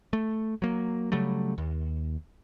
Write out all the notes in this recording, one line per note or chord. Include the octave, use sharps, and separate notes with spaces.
A3
F#3 A#3
C#3 F#3 G3 A3
D#2